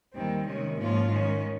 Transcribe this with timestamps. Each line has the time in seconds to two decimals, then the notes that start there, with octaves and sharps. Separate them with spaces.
0.14 D#2 D#3 G3 C4
0.46 C3 D#3 G#3 C#4
0.78 G#2 F3 A#3 C#4 F4
1.10 D#3 G#3 C#4